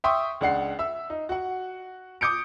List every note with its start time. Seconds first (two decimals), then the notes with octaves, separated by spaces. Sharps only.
0.04 E5 G5 C6 C#6 D#6
0.41 C#2 D4 F#5 C7
0.79 E5 E6
1.10 D#4
1.29 F#4 F#5
2.21 D6 D#6 G6 C#7 D7